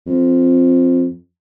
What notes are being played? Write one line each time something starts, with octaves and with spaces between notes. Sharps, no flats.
F2